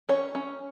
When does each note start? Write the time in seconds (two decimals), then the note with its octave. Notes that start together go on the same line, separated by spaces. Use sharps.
0.09 C#4 C#5
0.35 C#4